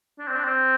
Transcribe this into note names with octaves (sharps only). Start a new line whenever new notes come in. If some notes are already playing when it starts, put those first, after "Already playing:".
D4
C4
D4
C4